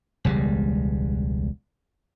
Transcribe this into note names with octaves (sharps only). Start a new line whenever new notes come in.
E1 C#2 G3 G#3